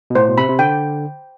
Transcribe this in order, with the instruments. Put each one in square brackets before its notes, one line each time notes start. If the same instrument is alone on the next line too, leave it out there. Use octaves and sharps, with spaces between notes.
[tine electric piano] B2
[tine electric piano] A2 [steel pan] C5
[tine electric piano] B2
[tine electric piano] C3 [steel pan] B5
[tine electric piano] C3
[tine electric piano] D3 [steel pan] G5